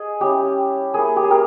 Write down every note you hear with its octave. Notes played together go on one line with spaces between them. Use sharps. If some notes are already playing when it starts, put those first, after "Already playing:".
Already playing: G#4 D#5
G3 C#4 E4 G4
A#3 E4 G#4
G4
G#4
G4 A#4